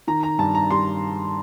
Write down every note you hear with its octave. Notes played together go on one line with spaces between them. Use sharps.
D#3 A#5
A#5
G2 A5
A#5
G3 C6